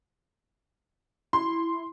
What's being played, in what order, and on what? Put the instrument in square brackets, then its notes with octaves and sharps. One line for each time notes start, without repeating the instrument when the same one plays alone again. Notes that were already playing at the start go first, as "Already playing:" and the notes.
[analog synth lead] E4 [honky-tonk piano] C6